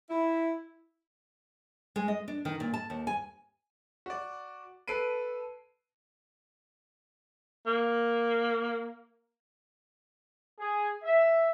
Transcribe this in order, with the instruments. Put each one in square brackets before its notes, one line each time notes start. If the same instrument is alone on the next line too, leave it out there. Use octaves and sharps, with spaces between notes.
[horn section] E4
[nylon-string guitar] G#3
D#5
D4
D#3
A#2
A5
D#2
G#5
[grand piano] F#4 D5
A4 B4 C7 D7 D#7
[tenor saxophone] A#3
[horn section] G#4
E5